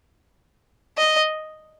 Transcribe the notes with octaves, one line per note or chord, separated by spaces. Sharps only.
D#5